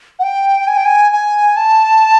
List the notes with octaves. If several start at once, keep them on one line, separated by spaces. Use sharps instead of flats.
F#5
G5
G#5
G5
G#5
G#5
A5